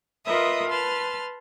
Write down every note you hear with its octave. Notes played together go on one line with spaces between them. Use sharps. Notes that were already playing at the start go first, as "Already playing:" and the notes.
F4 A#4 B4 D#5 E5 D#6
B4 A5 C6 F6